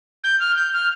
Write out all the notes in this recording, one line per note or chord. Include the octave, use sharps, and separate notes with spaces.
G6
F6
G6
F6